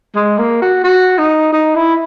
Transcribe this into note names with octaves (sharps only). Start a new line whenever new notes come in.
G#3
A#3
F#4
F#4
D#4
D#4
E4